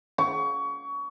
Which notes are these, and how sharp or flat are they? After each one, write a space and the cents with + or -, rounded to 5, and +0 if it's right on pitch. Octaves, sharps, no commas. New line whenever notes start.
C#6 +25